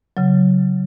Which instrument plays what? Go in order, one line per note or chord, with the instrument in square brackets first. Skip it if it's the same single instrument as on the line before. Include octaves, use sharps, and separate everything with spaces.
[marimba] C#3 F#3